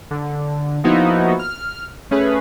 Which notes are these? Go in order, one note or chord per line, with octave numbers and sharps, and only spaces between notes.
D3
F3 A#3 B3 D#4 E4 F#4
F6
A3 C#4 G#4 B4